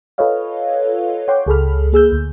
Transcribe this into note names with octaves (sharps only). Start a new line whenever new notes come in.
F4 A4 B4 C#5 D#5 F5
C#5 F#5 G5 C6 D6
C#2 G#4 A4 B5 F6
A#3 G#4 E6 G6
D2